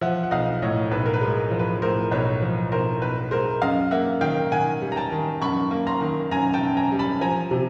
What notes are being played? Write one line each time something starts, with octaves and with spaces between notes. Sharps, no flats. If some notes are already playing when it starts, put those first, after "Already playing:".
F3 E5 F#5
F#5
B1 D#5 F5
A2 C#5 D#5
B1 B4
A#4
B4
G#3
A#4
F3
B4
A2 A#4 C5
B1 B4 C#5
F3
B1 A#4 C5
B1 B4
G#3 A#4 C5
F#2 D#5 F5
A#3 E5 F#5
D#3 F5 G5
D#3 F#5 G#5
G3
A#5
G5 A5
D#3
F#2 B5 C#6
A#3
A#5 C6
D#3
F#2 G#5 A#5
G5 A5
F#2
G#5 A#5
G3
A5 B5
F3 G#5 A#5
C3